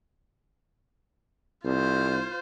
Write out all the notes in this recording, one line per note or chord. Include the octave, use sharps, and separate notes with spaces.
C2 F4 C5